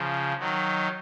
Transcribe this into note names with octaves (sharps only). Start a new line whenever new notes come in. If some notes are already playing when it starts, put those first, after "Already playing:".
Already playing: C#3 F3
D#3 F#3